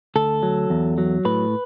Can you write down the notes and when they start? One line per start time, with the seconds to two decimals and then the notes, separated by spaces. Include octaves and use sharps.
0.16 D2 A4
0.43 F#3
0.70 E2
0.98 F#3
1.25 A2 B4